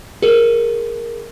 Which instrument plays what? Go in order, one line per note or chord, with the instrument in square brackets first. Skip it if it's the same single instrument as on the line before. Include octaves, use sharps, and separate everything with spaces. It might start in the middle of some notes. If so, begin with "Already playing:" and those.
[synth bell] G#4 A#4